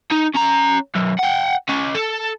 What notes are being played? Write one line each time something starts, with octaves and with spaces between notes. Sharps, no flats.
D#4
C#4 A#5
B1 F#2
F#5 G5
C#4 D#5
A4